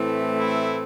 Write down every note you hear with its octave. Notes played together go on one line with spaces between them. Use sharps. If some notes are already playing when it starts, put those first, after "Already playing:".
Already playing: A2 E3 A3 C4
E4